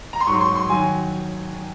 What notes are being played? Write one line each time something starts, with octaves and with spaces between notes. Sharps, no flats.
A#5
C6
G#2 F#3 C#6
C6
C6
D#3 F#3 G#5